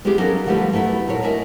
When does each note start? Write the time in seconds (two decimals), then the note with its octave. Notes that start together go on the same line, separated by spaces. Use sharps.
0.05 G#3 B3 C#4 E4 G4 G#4
0.18 F#3 C#4 D#4 A4 A#4 F5
0.46 D3 F3 G3 A3 G4 B4
0.72 F#3 A3 B3 E4 B4
1.07 A#2 F#4 A4 A#4 C#5
1.23 D4 E4 A#4 D#5 E5 G#5